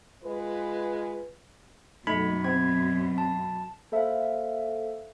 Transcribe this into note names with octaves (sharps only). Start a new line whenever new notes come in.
G#3 F4 B4
F#2 B2 A3 D#4 B5
C4 G#6
A5
A#3 A4 C5 E5 F5